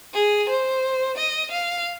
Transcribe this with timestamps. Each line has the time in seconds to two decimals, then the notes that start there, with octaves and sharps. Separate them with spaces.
0.14 G#4
0.49 C5
1.17 D#5
1.51 F5